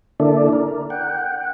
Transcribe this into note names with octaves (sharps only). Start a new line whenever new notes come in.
D3 A#3 D4 E4 A4 D5
A#4
F#5 G5